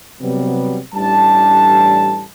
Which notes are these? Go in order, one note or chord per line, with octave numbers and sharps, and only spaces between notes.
C3 F#3 G3 B3
A1 G3 D4 A5